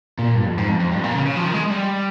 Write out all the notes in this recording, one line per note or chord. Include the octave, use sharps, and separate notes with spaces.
A#2
G2
F2
G#2
F2
F2
G2
A#2
C#3
C#3
F3
D#3
G#3
G3